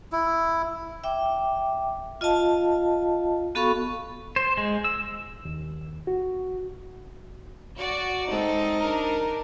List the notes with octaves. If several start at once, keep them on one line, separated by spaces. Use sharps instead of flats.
E4
E5 G5 D6
F4 D#5 F5 A5
B3 F#4 A4 F5 B5 C#6
C5
G#3
E6
D#2
F#4
F#4 D5
G#3 C4 D#4 A4
D4 A#4